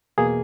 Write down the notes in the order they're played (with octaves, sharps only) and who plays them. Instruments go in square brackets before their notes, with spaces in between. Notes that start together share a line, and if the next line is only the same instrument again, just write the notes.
[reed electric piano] E2 B2 A#3 G#4